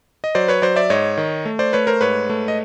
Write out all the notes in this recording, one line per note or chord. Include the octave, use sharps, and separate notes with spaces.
D#5
F#3 C5 D5
B4 C#5
F#3 C5 D5
D5 E5
G#2 C#5 D#5
D#3
A3
C5 D5
A3 B4 C#5
A#4 C5
G#2 B4 C#5
A3
D#5